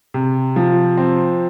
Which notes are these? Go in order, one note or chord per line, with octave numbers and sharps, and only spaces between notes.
C3
F3
C4